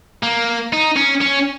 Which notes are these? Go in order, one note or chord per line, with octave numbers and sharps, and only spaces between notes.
A#3
D#4
C#4
C#4